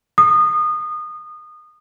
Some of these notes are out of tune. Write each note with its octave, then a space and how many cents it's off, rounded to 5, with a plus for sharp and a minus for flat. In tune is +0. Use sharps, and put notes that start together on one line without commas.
D#6 -25